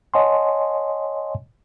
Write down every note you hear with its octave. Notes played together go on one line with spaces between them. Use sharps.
C#5 D#5 F#5 G#5 A5 C6